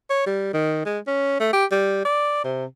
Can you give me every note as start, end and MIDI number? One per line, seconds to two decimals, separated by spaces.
0.10 0.24 73
0.26 0.50 55
0.54 0.82 51
0.86 0.99 56
1.07 1.39 61
1.40 1.50 57
1.53 1.65 67
1.72 2.05 55
2.05 2.39 74
2.44 2.66 48